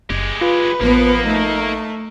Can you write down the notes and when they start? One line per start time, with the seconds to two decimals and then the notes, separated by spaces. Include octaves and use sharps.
0.10 F#1 G#3 G4
0.41 F4 B4
0.81 A1 F3 A#3 B3
1.26 A3 D#4